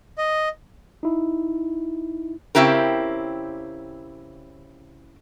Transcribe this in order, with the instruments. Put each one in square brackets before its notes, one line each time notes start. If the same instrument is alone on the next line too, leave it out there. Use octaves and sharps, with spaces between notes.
[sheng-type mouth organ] D#5
[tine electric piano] D#4 E4
[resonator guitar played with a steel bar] C#3 C4 E4 G4 A#4